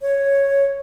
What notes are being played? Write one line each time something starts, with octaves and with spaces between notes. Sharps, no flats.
C#5